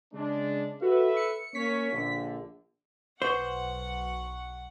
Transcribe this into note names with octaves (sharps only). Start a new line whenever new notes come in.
C#3 G#3 D4
F#4 A4 B4 E5
C#7
A#3 C#4 C#5 B6
A#1 D3
B1 B4 C5 F#5 C#6 D6